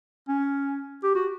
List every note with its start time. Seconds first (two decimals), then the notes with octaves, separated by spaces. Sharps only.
0.28 C#4
1.03 G4
1.15 F#4